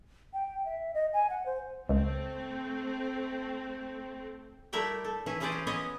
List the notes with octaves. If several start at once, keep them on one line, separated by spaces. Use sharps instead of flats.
G5
E5
D#5
G#5
F#5
C5
C#2 A3 C4
G3 A3 E4 A#4 E5 G5
A4
E3 C#4 E4
E3 C#4 G#4 B4 C5 D5
C#4
B3 C#4 E4 C#5 D#5 G#5